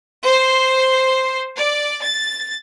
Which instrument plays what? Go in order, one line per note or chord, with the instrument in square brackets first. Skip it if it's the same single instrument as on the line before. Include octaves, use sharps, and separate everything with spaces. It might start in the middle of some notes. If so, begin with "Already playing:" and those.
[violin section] C5
D5
A6